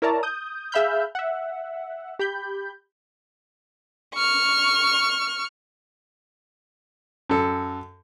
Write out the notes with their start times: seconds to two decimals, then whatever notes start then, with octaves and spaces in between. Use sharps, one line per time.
0.02 E4 A#4 C#5 D5 A5 A#5
0.23 D#6 G6
0.72 G#4 E5 F5 B5 F6 G6
1.15 E5 F#5
2.19 G4 B5 G6
4.15 C#6 F6
7.29 F#2 A4